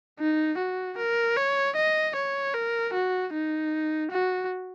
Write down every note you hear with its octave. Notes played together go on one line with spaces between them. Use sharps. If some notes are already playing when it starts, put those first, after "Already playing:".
D#4
F#4
A#4
C#5
D#5
C#5
A#4
F#4
D#4
F#4